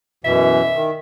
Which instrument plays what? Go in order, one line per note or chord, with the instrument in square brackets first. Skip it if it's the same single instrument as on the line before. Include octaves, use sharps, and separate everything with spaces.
[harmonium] F#2 B2 E3 [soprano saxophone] E5
[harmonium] D#3